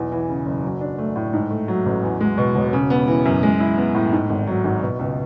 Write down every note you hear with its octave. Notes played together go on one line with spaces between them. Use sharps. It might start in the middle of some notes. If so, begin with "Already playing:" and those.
Already playing: B1 E2
E3
C#3
F#1
F#3
D4
A3
A2
G#2
A3
F#3
A1
E2
G#3
B2
E1
C#3
B3
E3
F#2
G#3
E4
B3
A2
G#2
G#1
F#3
G#1
B2
C#2